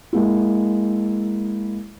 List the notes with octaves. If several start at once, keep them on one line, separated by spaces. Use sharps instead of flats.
G#3 A#3 E4